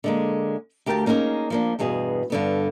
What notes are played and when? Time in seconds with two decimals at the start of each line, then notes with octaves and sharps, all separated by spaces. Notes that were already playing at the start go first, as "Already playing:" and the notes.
0.04 D3 G#3 A#3
0.86 D2 G4 A#4 F5 G5 A5
1.06 A#3 C#4 D#4 G#4 A#4
1.50 F3 A#3 D4
1.79 E2 G2 B2 G#4
2.30 G2 D3 B3